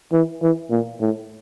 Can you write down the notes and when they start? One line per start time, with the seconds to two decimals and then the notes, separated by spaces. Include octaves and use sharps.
0.13 E3
0.42 E3
0.70 A#2
1.00 A2